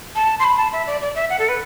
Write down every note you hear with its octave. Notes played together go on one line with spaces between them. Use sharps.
A5
C6
B5
A5
E5
D5
D5
E5
F#5
A4
B4